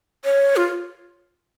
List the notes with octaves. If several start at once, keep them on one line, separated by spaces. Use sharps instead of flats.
C#5
F4